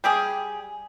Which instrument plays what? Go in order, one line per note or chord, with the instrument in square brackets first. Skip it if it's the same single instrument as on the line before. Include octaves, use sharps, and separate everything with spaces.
[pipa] G3 G4 G#4